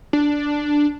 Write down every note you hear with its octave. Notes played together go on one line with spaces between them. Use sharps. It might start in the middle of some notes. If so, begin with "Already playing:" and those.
D4